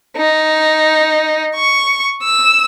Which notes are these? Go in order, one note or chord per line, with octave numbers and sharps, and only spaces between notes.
D#4
C#6
E6